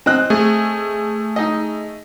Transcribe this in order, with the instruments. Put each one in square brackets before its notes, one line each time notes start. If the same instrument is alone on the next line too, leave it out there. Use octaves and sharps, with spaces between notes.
[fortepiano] C4 D#5 F#6
[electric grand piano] A3 G#4
[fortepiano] D#4 D#5